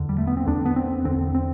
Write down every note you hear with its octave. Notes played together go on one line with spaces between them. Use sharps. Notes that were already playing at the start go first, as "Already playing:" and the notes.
Already playing: E2 D3
G3
A3
B3
C4
E2 D3 D4
B3
C4
E2 D3 C4
C4